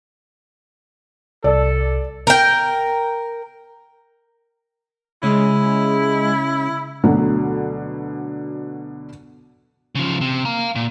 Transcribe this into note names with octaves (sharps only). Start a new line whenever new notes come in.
C2 A4 D5
A#4 G5
C#3 G#3 C#4 E4
D2 B2 D3 F#3 B3
C#3 F3
C3
F5 A#5
A#2